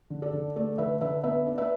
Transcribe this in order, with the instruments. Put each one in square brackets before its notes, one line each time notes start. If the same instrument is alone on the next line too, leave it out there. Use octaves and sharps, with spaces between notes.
[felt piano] D3
A4 D5
D3
A3 A4 D5
D3 B4 E5
D3 B4 E5
B3 B4 E5
D4
B4 E5